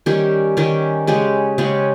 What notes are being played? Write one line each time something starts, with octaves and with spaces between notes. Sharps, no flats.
D#3 G3 C#4 G4
D#3 G3 C#4 G4
C#3 G#3 C#4 G4
C#3 G#3 C#4 G4